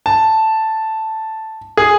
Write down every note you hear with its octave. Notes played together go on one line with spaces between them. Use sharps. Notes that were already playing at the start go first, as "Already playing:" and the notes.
A5
G#4